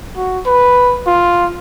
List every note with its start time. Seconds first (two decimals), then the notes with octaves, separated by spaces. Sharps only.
0.16 F#4
0.46 B4
1.07 F4